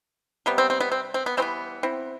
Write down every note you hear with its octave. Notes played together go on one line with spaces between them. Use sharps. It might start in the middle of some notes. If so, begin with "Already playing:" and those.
C3 G3 B3
C4
C4
B3
C4
C4
B3
E3 G3 B3 C4
C4 E4